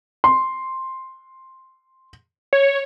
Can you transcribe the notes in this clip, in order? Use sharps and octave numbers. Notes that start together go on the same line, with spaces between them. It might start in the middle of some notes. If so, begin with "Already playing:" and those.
C6
C#5